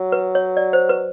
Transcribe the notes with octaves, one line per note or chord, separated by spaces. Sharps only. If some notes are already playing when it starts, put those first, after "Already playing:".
Already playing: F#3
B4
C#5
D5
C5
B4